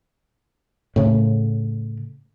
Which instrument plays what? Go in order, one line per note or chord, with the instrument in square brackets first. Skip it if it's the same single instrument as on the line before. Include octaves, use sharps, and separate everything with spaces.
[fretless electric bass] A2 C#3